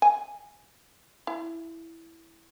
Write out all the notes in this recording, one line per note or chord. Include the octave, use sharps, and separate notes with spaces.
G#5
E4